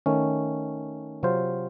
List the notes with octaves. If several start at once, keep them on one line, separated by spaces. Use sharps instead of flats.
D#3 A3 C#4
C3 F#3 C4 F4 C5